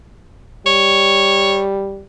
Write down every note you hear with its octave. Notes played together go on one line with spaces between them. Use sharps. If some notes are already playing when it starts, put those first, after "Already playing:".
G3 C#5